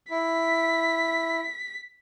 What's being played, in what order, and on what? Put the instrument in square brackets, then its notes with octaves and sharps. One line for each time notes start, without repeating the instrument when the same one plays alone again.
[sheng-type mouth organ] E4 [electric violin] B6